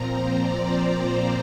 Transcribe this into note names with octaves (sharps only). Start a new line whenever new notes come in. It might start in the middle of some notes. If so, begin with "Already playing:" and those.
Already playing: A#2 F3 C4 C5 A#5
D5
D5